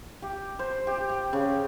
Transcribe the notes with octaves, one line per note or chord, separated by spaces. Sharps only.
G4
C5
G4
G5
C#3